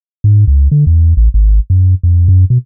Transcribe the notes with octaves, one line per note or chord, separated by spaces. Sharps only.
G#2
C#2
D3
E2
A1
G#1
F#2
F2
F#2
B2